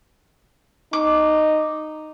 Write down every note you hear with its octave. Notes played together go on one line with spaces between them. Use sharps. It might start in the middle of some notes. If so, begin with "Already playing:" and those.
D#4 D6